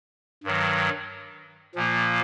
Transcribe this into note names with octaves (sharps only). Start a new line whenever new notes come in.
G2 D#3 F#3
A#2 F3 A#3